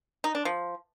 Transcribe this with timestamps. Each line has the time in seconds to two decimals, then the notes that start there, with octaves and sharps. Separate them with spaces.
0.24 D#4
0.35 D4
0.45 F3